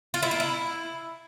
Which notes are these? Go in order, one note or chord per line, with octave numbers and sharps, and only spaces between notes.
F4
E4
A#3
E4